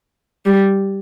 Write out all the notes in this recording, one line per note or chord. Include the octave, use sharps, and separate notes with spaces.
G3